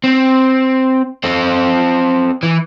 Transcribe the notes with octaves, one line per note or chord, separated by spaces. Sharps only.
C4
C4 A4
E3